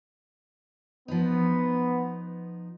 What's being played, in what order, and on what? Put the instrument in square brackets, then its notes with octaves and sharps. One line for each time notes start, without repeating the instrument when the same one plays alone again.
[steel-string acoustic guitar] F3 D#4 [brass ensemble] B3